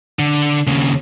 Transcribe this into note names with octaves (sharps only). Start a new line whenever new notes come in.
D3
D#2 C#3